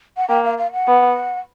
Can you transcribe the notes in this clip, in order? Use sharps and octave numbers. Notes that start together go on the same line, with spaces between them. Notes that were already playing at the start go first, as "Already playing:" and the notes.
F#5
A#3 G5
F5
F5
F#5
B3